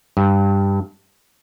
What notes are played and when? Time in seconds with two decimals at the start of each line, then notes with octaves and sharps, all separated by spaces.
0.17 G2